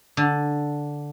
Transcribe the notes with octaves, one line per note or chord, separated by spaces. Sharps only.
D3